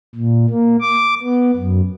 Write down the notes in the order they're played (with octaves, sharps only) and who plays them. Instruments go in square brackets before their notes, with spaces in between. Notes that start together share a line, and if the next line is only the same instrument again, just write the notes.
[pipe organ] A#2
A#3
D6
B3
F#2